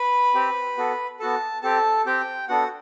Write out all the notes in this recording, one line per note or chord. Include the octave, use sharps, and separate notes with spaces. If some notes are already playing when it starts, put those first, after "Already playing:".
Already playing: B4 B5
C4 G4
B3 F#4 A4
B3 F#4 A4 A5
C4 G4 A4 A5
C4 G4 G5
B3 D4 F#4 A4 F#5